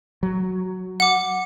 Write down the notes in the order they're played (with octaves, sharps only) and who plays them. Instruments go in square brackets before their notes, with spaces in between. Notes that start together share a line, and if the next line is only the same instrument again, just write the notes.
[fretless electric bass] F#3
[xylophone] F#5 D6